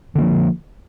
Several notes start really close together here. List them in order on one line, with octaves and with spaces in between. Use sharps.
D3 A#3 F3